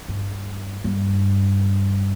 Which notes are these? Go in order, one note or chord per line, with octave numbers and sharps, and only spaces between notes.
G2
G2